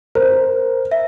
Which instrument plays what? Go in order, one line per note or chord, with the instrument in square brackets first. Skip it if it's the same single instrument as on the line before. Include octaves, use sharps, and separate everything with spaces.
[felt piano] A#4 [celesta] C5
[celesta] E5